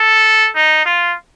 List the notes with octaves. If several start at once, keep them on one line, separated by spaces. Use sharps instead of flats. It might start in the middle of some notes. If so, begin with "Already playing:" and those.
Already playing: A4
D#4
F4